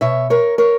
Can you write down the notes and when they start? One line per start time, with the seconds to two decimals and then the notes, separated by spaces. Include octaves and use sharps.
0.01 B2 C#5 E5
0.30 A#4 C#5
0.58 A#4 C#5